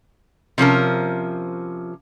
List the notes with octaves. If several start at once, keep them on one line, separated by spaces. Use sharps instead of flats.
C3 F3 C#4 A#4